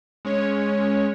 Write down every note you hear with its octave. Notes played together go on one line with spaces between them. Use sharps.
G#3 C#4 C#5